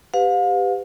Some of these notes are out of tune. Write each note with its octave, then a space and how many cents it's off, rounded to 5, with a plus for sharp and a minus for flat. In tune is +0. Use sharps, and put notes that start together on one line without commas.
G4 +10 B4 +30 F5 +40